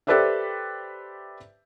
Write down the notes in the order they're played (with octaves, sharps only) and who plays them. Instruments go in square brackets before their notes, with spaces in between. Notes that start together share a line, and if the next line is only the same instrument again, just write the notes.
[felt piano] G4 A4 B4 C5 D5 E5